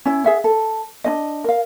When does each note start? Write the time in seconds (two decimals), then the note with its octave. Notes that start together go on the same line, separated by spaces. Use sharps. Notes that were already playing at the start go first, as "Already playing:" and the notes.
0.05 C#4 E4
0.24 G#4 E5 F#5
0.44 A4
1.04 D4 D#4 D#5
1.44 A#4 F5